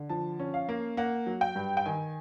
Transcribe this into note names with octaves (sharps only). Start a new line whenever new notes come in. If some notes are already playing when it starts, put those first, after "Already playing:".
Already playing: D3
F3 A5
C#4
F5
A#3
A#3 F#5
F#3
G5
G2
G5
D#3 G#5